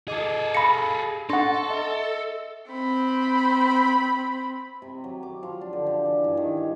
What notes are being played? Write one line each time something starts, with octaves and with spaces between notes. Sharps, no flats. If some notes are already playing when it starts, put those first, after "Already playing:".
G#4 A4 D#5 D6 G#6
F5 B5 A#6 C#7
D4 A4 F#5 C6 C#6 A#6
D#5 E5
C4 B5
C3
F#3
D6
F3
D4
D3
G4
E3
G2
D#3
C#5